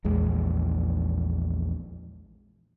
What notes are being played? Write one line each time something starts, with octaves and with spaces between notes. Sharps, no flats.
A#1 E2 G#3